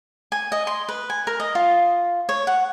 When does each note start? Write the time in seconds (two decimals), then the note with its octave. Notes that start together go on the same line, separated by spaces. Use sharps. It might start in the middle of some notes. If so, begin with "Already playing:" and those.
0.32 G#5
0.52 D#5
0.67 C6
0.89 B4
1.10 G#5
1.27 A#4
1.40 D#5
1.55 F4
2.29 C#5
2.47 F#5